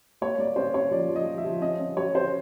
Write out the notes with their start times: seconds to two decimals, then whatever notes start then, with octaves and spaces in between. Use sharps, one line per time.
0.21 A#3 C#5
0.38 A#3 D5
0.56 C#4 C5
0.74 C#4 C#5
0.91 F3 D5
1.09 F3
1.16 D#5
1.27 F3
1.38 E5
1.45 F3
1.61 C#4 D#5
1.80 C#4
1.97 F#3 C#5
2.15 C#4 C5